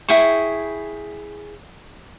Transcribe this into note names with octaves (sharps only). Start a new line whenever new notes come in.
E4 G#4 G5 C#6